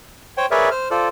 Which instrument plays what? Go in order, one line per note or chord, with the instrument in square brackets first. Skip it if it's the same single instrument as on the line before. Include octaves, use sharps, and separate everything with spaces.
[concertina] C5 C#5 G5
G#4 A#4 B4 C#5 D5 E5
C5 F6
F4 A4 C5 D5